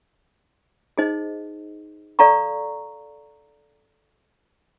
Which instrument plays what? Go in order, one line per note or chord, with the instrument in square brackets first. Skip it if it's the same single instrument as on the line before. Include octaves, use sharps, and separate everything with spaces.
[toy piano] D#4 G#4 C5 D#5
A4 D5 F5 A#5 C#6